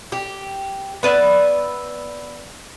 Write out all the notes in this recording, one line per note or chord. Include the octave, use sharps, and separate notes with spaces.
G4
B3 B4 D5 E5